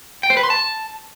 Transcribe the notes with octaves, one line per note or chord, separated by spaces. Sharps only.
G5
C5
B4
C6
A5